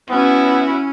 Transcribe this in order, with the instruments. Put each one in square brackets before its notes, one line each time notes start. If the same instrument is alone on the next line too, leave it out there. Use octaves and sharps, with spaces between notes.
[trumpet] B3 [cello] C#4 [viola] E4 F#4